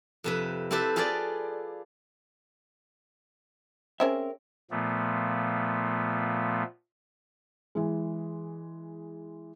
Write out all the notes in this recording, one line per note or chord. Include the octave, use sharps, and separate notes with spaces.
F2 C3 B4
C4 E4 G4 A4 B4
F4 G#4 A4 B4 D5
C4 C#4 G#4 A#4 E5
A#2 F3 A3 B3
E3 G#3